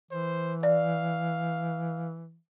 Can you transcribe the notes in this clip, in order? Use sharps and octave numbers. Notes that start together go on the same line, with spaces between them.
E3 C5
D5 F5